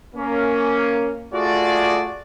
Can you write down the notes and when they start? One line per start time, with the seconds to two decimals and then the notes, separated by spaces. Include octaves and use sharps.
0.16 A#3 C#4
1.33 A3 F4 F#4 G#4 D5